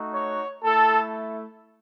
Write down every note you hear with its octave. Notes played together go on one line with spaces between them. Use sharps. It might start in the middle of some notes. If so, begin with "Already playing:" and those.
Already playing: A3 D#4 F#4
C#5
A3 E4 A4